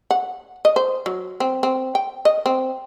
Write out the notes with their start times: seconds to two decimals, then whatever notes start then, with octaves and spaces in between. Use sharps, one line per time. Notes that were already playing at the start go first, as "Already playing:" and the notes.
0.11 F#5
0.65 D#5
0.76 C5
1.06 F#3
1.40 C4
1.63 C4
1.95 G5
2.25 D#5
2.46 C4